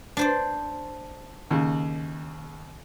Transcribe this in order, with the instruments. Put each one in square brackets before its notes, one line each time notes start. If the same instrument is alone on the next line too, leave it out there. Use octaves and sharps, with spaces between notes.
[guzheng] D4 C5 D5
[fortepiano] D#2 C#3